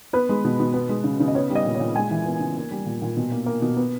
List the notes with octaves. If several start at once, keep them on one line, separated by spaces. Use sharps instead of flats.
B3 B4
G#3
B2
B2
B3
G#3
C#3
C#3
D#5
B3 C#5
G3
D#5
A#2
C#5
A#2
G#3 G#5
E3
B3
C#3
A#3
G3
A#2
A#2
B2
A#3
A#3
B2
B3